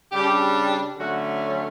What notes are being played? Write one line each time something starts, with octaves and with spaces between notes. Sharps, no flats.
C#3 G3 D4 G4
D3 F#3 A3 C#4 F#4